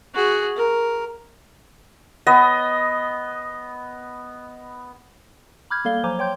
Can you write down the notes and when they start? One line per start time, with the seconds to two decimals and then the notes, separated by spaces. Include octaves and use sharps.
0.15 F#4 G#4
0.56 A#4
2.27 B3 D#5
5.70 B5 D6 F6 G6 G#6
5.85 G3 A#3 A4 D5 F5 G7
6.03 F3 F#3 C5 G#5 A#5 D6
6.19 C#5 G5 C6 G6